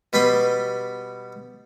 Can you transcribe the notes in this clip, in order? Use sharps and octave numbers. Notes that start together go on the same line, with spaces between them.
B2 G3 B4 B5 C6